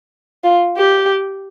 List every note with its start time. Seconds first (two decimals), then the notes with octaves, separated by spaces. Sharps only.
0.44 F4
0.77 G4